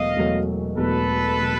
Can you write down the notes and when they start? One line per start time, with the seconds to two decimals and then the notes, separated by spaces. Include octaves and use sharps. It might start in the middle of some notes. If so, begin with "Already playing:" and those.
Already playing: E1 E2 B2 F#3 A3 D#5 F5
0.17 E1 E2 B2 F#3 A3
0.77 E1 E2 B2 F#3 A3 A4 B4
1.39 B2 F#3 A3